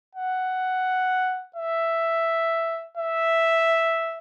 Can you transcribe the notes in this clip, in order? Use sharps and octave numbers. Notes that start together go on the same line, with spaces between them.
F#5
E5
E5